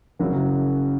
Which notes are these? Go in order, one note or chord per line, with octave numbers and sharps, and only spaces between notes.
F#1 F#2 C#3 F#3